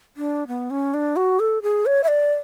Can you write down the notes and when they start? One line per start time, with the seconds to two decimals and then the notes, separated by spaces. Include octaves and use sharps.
0.17 D4
0.48 B3
0.70 C#4
0.94 D4
1.16 F#4
1.40 A4
1.62 G#4
1.86 C#5
2.04 E5
2.08 D5